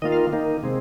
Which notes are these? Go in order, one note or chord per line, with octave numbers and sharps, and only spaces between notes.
D#3 A#3 F4 D#5
F5
D#3 A#3 D#4
C3 G#3 C4